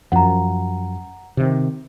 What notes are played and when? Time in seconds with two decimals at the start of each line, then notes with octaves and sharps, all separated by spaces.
0.12 F#2 F3 F#5 A#5
1.37 C3 D#3